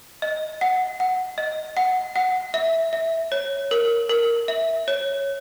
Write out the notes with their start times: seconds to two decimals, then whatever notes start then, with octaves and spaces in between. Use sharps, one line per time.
0.22 D#5
0.61 F#5
1.00 F#5
1.38 D#5
1.77 F#5
2.16 F#5
2.54 E5
2.93 E5
3.32 C#5
3.71 A#4
4.09 A#4
4.48 E5
4.88 C#5